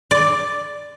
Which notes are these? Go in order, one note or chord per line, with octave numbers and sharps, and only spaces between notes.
D5